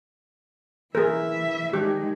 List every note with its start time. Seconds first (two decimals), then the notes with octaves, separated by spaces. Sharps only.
0.95 E3 G#4 A#4 E5
1.73 D#3 G#3 G4